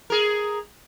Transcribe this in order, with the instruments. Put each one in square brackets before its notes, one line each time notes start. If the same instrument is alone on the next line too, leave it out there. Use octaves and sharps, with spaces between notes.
[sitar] G#4 A#4